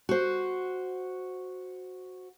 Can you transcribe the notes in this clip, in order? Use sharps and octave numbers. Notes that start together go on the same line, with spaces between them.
F#4 C5